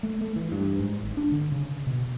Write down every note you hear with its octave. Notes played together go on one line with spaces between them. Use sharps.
A3
A3
E3
G2
G#2
G#1
D4
D3
C#3
B2